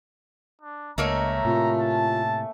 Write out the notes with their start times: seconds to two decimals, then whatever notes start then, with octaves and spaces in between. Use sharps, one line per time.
0.62 D4
0.98 C#2 A3 A#3 C#4 D#5 A#5
1.45 A2 C3 F4
1.79 A5